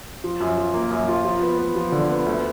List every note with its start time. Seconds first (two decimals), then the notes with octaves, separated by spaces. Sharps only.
0.24 F3
0.40 F#2
0.57 F4
0.74 A#3
0.91 F#2
1.08 F4
1.25 F3
1.42 B3
1.59 B3
1.76 F3
1.92 D3
2.09 B3
2.26 D2